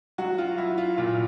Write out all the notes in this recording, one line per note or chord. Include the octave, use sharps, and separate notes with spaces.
F#3 F#4
F4
F#3 E4
F4
A#2 F4